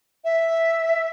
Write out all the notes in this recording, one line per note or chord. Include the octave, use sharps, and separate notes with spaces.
E5